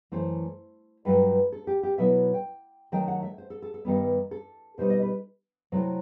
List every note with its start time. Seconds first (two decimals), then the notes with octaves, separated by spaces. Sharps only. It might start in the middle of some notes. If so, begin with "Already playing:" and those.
0.12 F#2 E3 A3 C5
1.05 G2 F#3 A3 B4
1.52 A4
1.67 G4
1.83 G4
1.98 B2 F#3 B3 E4 E5
2.34 G5
2.92 D#3 F#3 A3 G5
3.08 F#5
3.22 E5
3.38 C5
3.50 A4
3.62 A4
3.74 A4
3.85 G2 D#3 G3 B3
4.31 A4
4.78 B2 G3 D#4 C5
4.90 D#5
5.02 B4
5.72 C3 F#3 A3 E4